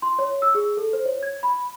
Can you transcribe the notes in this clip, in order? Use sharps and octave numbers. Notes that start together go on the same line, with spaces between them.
C6
C#5
E6
G#4
A4
C5
C#5
G#6
B5